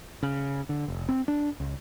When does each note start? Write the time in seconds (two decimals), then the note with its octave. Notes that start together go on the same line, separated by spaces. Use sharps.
0.23 C#3
0.69 D3
0.88 F1
1.09 C4
1.28 D4
1.60 C#2